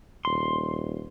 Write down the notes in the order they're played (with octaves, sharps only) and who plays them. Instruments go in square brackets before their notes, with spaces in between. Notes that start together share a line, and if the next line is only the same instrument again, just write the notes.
[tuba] D#1 [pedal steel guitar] C6